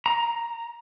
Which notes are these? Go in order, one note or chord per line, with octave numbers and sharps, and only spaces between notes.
A#5